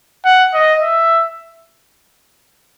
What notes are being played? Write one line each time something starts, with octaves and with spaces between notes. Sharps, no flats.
F#5
D#5
E5